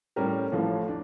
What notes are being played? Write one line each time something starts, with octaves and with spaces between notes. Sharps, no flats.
A2 G3 C#4 G4 A#4
A1 A2 F3
D4